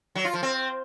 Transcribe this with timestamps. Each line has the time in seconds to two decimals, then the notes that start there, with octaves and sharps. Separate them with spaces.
0.15 F#3
0.25 F4
0.34 F3
0.43 C4